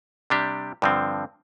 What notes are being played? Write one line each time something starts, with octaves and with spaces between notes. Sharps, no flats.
C3 G3 D4 G4
G2 D3 F3 C4